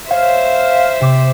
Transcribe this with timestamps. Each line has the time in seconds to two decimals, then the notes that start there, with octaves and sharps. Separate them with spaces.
0.11 C5 C#5 E5 F5
1.01 C3 D6